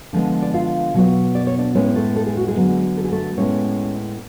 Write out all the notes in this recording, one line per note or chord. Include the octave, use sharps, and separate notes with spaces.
D3 F3 G#3 B3
D5
F4 F5
B2 F#3 B3
D5
C#5
D4 D5
A2 G#3 B3 C#4 C#5
A3 A4
A4
G#4
F#4
G#3 G#4
D3 F#3 B3
A4
G#4
A3 A4
A2 G#3 B3 C#4 C#5